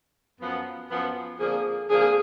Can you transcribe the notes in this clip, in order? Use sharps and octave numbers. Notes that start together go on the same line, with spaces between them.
F#2 F3 B3
F#2 F3 B3
F2 D3 F3 A#3 G#4
F2 D3 F3 A#3 G#4